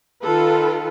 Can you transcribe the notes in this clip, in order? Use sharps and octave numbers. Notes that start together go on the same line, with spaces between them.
D#3 F4 A4 B4